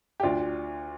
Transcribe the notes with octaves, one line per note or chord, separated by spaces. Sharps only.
G4
D2 D4 F4